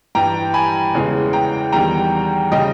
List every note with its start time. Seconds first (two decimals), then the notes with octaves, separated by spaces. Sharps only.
0.15 G2 E3 G3 G5 A#5
0.54 G#5 B5
0.94 E2 C#3 E3 G#3
1.33 G5 A#5
1.72 E2 D#3 G3 G5 A#5
2.51 C#3 G3 D#5 G5